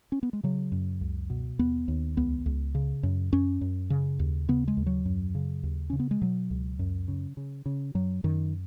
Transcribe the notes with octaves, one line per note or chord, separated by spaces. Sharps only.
C#4
B3
G#3
C#3 F#3
F#2
C#2
B2
D#2 B3
D#2
C#2 B3
C#2
C#3
F#2
F#2 C#4
F#2
C#3
D#2
C#3 B3
G#3
D#2
F#3
F#2
C#3
D#2
C#3 C#4
B3
G#3
B2 F#3
C#2
F#2
C#3
C#3
C#3
F#2 F#3
F#2 D#3